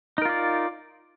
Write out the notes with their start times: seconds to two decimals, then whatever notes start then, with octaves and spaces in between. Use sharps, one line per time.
0.18 D#4
0.22 A#4
0.25 F4
0.29 D5